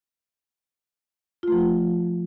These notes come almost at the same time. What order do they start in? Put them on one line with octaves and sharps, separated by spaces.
F4 A3 F3